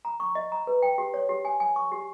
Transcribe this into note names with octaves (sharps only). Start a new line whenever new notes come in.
A#5
C#6
D#5
A#5
B4
G5
G4
C#5
G4
G#5
G#5
C#6
G4